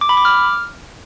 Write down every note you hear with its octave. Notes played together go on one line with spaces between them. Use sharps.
D6
B5
D6
F6